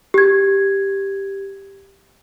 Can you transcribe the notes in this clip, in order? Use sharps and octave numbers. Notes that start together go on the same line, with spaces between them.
G4 G#6